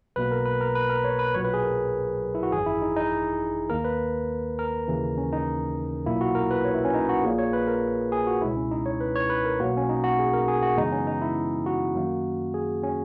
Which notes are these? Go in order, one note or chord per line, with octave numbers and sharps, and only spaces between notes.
B1 B2 A#3 B4
A#4
B4
A#4
B4
A#4
C#5
B4
B1 A#2 F#3 C#5
B4
G#4
A#4
E4
F#4
G#1 F#2 E3 G#4
E4
D#4
D#4
D#2 D#3 A#3 A#4
B4
A#4
D#2 C#3 E3
C#4
D#4
B1 A#2 A#3 E4
F#4
A#4
B4
C#5
E4
C#4
D#4
F#4
A#1 A#2 A#3 G#4
C#5
B4
A#4
G#4
F#4
C#2 B2 G#3 E4
C#4
D#4
C#5
B4
C#5
B4
A#4
B1 B2 A#3 F#4
C#4
D#4
F#4
G#4
A#4
G#4
F#4
F#2 C#3 E3 G#3 B3 D#4
C#4
D#4
E4
F#4
F#2 D#3 A#3
G#4
C#4